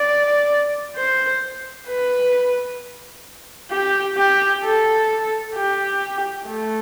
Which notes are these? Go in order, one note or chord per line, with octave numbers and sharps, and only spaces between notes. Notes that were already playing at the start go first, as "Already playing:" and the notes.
Already playing: D5
C5
B4
G4
G4
A4
G4
A3